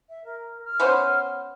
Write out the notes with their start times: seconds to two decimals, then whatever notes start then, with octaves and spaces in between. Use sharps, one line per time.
0.09 E5
0.25 A#4
0.64 F6
0.80 B3 C#4 C5